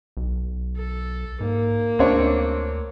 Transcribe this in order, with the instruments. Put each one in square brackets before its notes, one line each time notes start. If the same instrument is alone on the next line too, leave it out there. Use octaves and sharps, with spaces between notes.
[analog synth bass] B1
[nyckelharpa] A4
[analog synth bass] G#2 [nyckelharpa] A#3
[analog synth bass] D2 [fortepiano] C4 D4 C#5